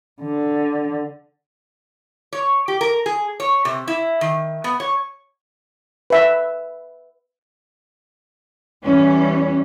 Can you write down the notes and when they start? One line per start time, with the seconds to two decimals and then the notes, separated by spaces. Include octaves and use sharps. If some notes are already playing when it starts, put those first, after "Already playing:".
0.22 D3
2.33 C#5
2.68 G4
2.81 A#4
3.06 G#4
3.40 C#5
3.65 C3
3.88 E4
4.21 D#3
4.64 B3
4.80 C#5
6.10 B4 E5
8.84 E2 E3 G3 C#4